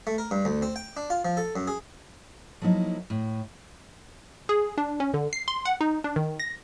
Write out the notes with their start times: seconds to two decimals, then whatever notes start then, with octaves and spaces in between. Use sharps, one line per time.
0.07 A3
0.18 A#4
0.31 G2
0.45 D2
0.62 C4
0.76 G5
0.97 D4
1.10 F4
1.25 F3
1.37 A4
1.56 F#2
1.67 G#4
2.62 F3 F#3 A#3 D#4 E4
3.10 A2
4.49 G#4
4.78 D4
5.00 C#4
5.14 D3
5.33 C7
5.48 C6
5.65 F#5
5.81 D#4
6.04 D4
6.16 D#3
6.40 A#6